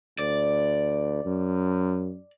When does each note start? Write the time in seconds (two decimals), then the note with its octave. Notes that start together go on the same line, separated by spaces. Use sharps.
0.19 D2 D5
1.25 F#2